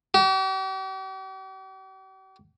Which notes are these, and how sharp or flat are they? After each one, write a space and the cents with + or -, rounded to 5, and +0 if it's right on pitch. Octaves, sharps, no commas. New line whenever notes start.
G4 -45